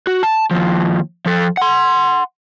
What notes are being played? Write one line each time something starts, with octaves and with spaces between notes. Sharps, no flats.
F#4
A5
D#2 F3
F3 A4
F#5 C6